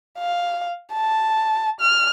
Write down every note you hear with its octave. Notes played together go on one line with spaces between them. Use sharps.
F5
A5
F6